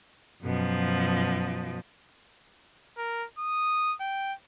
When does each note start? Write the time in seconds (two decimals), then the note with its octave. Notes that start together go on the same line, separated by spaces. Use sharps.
0.42 F#2 B2 F3
2.97 A#4
3.39 D#6
4.00 G5